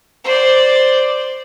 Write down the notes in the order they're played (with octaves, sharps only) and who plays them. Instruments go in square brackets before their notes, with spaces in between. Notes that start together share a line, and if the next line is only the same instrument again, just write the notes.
[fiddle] C5 D5